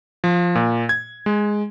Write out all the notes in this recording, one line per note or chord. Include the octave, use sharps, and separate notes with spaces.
F3
A#2
G#6
G#3